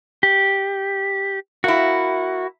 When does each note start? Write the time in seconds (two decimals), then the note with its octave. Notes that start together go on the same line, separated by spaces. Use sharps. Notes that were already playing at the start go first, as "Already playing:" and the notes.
0.23 G4
1.64 A#3 E4 F#4